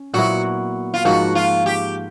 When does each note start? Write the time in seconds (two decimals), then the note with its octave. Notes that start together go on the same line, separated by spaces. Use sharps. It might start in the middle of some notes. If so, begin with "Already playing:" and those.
Already playing: C#4
0.13 A#2 F#3 B3 E4 F#4
0.94 F4
1.05 G#2 F3 A#3 F#4
1.35 F4
1.66 G4